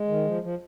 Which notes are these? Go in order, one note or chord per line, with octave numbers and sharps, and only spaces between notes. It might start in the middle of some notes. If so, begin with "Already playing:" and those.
Already playing: G#3
D#3
F3
F3